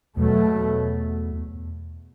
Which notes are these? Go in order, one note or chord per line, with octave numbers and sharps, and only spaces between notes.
E2 B2 F#3 A3